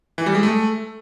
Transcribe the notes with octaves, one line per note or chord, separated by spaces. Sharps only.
E3
G3
G#3
A3